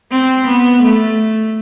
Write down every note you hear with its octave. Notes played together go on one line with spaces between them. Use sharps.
C4
B3
A3